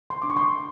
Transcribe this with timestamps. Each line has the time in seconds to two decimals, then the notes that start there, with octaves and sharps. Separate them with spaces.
0.10 C6
0.22 D4 D6
0.30 C#6
0.37 C6